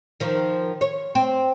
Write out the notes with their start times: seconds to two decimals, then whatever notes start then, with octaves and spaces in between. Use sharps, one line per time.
0.20 D#3 F3
0.81 C#5
1.15 C4